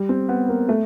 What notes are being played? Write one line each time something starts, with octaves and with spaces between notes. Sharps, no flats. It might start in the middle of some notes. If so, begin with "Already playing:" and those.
Already playing: G3
C4
B3
A#3
A3